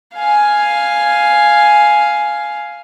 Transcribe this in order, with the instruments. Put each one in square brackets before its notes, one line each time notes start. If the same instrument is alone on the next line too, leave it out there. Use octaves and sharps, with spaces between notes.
[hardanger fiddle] F5 G#5